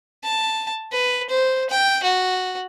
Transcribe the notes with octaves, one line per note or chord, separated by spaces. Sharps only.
A5
B4
C5
G5
F#4